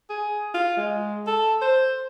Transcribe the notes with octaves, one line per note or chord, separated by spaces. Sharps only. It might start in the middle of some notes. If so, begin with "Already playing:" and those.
G#4
F4
G#3
A4
C5